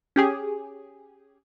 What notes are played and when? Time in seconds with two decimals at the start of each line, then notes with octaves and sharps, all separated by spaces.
0.16 C#4 G4 G#4